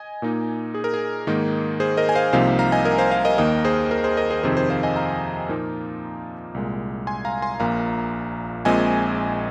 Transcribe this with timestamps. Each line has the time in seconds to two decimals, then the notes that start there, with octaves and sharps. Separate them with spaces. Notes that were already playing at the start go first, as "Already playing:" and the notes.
Already playing: D#5 G#5
0.22 A#2 A#3 D#4
0.74 G#4
0.84 A#4
0.94 G#4
1.27 G#2 D#3 A#3 D#4
1.80 G#4 C5
1.97 A#4 D#5
2.09 G#5
2.15 C5 F5
2.33 C2 C3 F3 A#3 D#4 C5 F5
2.59 F5 A#5
2.72 D#5 G#5
2.85 A#4 D#5
2.98 C5 F5
3.11 C5 F5
3.25 A#4 D#5
3.38 D#2 D#3 A#3 A#4 D#5
3.65 G#4 C5
3.91 A#4
4.04 G#4 C5
4.17 A#4 D#5
4.30 G#4 C5
4.43 F2 C3 D#3 C4 D#4 G#4 C5
4.57 G#4 C5
4.70 C5 F5
4.83 D#5 G#5
4.96 F5 A#5
5.49 A#2 F3 A#3 D#4
6.54 C2 A#2 G#3
7.07 G#5 C6
7.25 F5 A#5
7.42 G#5 C6
7.60 A#1 A#2 A#3 F5 A#5
8.65 A#1 A#2 G#3 C4 D#5 G#5